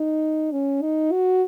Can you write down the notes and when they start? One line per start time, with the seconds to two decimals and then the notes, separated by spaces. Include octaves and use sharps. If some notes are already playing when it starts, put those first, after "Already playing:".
Already playing: D#4
0.52 C#4
0.82 D#4
1.12 F#4